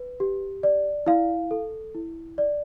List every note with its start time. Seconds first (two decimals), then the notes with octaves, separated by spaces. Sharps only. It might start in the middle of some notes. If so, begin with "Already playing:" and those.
Already playing: B4
0.20 G4
0.63 D5
1.07 E4 F5
1.51 A4
1.95 E4
2.38 D5